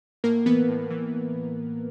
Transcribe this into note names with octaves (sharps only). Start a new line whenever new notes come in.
A2 A#3 A#4
E3 B3 B4
A2
E3